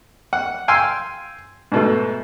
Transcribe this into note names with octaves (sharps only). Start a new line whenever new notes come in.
F#5
F5 G5 G#5 C6 E6
G#2 B2 A3